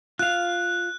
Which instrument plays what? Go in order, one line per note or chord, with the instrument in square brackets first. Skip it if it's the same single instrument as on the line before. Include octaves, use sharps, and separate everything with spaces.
[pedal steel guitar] F4 F5 [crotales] F#6